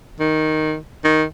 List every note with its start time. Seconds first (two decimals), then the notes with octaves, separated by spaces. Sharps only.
0.20 D#3
1.04 D#3